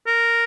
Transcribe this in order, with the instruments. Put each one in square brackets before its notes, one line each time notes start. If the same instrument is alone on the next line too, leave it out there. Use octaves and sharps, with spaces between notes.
[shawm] A#4